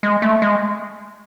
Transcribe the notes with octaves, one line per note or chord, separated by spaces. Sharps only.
G#3
A3
G#3